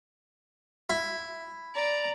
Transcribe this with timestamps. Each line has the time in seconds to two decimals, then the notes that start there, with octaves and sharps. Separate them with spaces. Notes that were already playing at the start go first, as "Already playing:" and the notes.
0.90 E4
1.74 D5 A#5